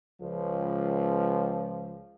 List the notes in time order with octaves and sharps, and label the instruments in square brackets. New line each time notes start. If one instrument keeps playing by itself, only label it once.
[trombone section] C#2 F3